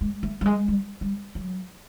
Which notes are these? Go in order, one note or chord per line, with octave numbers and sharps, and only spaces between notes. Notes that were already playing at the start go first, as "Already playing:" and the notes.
G#3
A3
G3
G#3
G3
G3
F#3